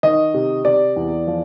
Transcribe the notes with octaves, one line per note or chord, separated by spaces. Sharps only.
D#3 D#5
C3
C3 D5
E2
F3